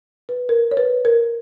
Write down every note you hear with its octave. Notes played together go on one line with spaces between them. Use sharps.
B4
A#4
C#5
B4
A#4